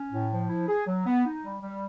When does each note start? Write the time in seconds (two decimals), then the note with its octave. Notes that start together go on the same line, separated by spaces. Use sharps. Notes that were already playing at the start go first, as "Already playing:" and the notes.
Already playing: C#4
0.12 A2
0.31 F3
0.49 E4
0.68 G#4
0.87 F#3
1.06 B3
1.25 D#4
1.44 G3
1.62 G3